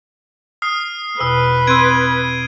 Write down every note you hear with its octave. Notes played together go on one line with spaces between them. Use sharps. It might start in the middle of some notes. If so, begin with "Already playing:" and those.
D#6 F6 C7
E2 B2 B4 E6
C4 C6 E6 G#6 D7 D#7